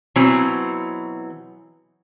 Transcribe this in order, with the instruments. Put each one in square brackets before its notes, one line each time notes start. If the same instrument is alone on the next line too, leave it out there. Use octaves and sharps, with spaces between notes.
[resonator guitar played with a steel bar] B2 E3 F#3 C4